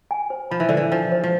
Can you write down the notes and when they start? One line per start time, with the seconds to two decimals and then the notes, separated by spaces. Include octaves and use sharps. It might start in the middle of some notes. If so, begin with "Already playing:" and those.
0.11 G#5
0.30 C5
0.51 F3 B5
0.60 E3
0.69 D3 C5
0.77 E3
0.91 F3 G#5
1.12 C5
1.24 F3